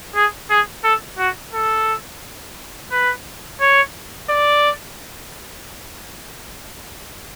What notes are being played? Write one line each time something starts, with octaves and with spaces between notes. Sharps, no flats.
G#4
G#4
A4
F#4
A4
B4
C#5
D5